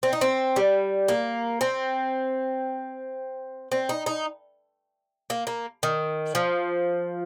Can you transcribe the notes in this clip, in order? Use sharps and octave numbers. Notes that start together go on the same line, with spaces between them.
C4
D#4
C4
G3
A#3
C4
C4
D#4
D#4
A#3
A#3
D#3
F3